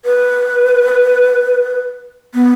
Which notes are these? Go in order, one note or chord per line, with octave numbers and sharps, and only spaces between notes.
B4
B3